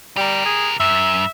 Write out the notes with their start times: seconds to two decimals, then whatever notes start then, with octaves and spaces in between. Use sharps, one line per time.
0.17 G3 G4 A#4
0.46 G#4
0.80 F#2 E5